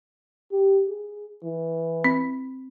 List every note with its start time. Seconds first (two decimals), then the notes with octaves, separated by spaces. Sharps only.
0.52 G4
0.89 G#4
1.43 E3
2.04 C4